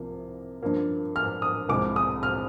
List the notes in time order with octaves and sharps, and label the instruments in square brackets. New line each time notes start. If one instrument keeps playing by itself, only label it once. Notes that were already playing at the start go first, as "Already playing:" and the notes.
Already playing: [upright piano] C2 C3 F3 A#3
G2 F3 A#3
F6
D#6
C2 C3 F3 G#3 D6
D#6
F6